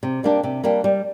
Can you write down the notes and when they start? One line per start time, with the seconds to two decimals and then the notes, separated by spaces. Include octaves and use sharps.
0.03 C3
0.23 G3 A#3 D4 G4
0.43 C3
0.64 G3 A#3 D4 G4
0.84 G3